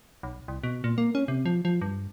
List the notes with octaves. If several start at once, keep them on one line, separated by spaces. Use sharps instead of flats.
B1
C2
B2
A#2
A#3
C#4
C3
F3
F3
G2